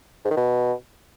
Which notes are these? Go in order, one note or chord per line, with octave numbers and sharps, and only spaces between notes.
G#2
D#3
B2